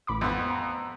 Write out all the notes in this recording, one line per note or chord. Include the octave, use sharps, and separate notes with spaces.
A1 B5 D6
F2 B3
A#5